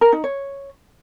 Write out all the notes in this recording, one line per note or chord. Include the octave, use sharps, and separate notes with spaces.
A#4
D#4
C#5